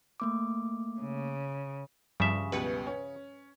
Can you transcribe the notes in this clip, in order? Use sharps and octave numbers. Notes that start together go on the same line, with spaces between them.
A3 A#3 D6
C#3
G2 C#3 F3 G3 E5
C#2 B2 G3 B4 C#7
C#4